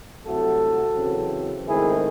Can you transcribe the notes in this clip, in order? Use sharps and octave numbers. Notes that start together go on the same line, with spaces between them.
C2 C3 F#3 A3 F#4 A4
F#2 C#3 E3 C4
G#2 D#3 A3 C4 E4 G#4